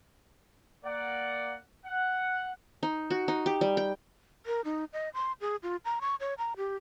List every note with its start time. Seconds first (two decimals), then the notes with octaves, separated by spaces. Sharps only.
0.84 A#3 D5 F#5
1.85 F#5
2.83 D#4
3.10 F#4
3.28 D#4
3.46 G4
3.61 G3
3.77 G5
4.46 A#4
4.65 D#4
4.93 D#5
5.14 C6
5.41 G#4
5.63 F4
5.85 A#5
6.01 C#6
6.20 C#5
6.38 A#5
6.57 G4